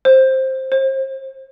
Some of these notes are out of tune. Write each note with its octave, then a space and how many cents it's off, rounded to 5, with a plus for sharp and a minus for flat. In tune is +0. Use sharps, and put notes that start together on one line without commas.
C5 +10
C5 +35